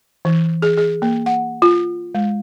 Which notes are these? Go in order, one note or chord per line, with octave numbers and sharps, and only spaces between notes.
E3
G#4
G#4
A#3
F#5
F4
G#3